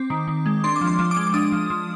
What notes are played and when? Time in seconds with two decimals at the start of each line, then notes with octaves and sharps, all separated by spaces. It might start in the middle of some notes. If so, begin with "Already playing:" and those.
Already playing: C4 D6
0.10 D#3
0.28 D#3
0.46 G#3
0.64 D4 C6
0.76 D6
0.81 F3
0.87 C6
0.99 F3
1.11 D6
1.17 G#3
1.27 D6
1.34 D4 D#6
1.52 F3
1.70 F3